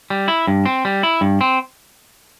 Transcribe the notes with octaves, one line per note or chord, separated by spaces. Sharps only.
G3
E4
G2
C4
G3
E4
G2
C4